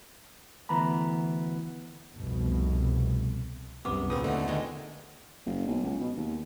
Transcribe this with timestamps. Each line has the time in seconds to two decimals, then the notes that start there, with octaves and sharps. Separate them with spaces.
0.69 D2 E3 B3 A#5 B5
2.16 F1 C2 B2
3.85 C2 F#2 C3 B3 D6 D#6
4.10 D#2 A#2 C#3 C4 F4 B4 D#6
4.24 D#2 D3 A3 B3 C4 D#4
4.48 D3 D#3 G#3 D#5
5.46 F#1
5.67 B1
5.83 C#2
6.00 B2
6.16 D#2